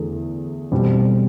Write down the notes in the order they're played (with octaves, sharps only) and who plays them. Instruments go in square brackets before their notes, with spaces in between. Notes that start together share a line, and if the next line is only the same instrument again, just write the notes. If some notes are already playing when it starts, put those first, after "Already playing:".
Already playing: [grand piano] E2 D3 A3
B2 G3 C4